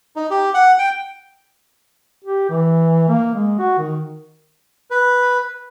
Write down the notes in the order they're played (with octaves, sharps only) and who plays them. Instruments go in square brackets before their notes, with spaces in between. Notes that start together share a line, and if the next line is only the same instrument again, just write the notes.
[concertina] D#4
G4
F#5
G5
[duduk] G4
E3
A#3
G#3
F#4
D#3
[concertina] B4